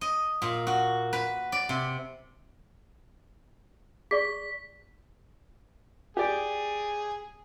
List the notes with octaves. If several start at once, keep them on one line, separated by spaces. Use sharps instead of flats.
D#5
A#2
F#4
B4
D5
C3
G#4 D5 C#6 B6
G4 G#4 D5 G5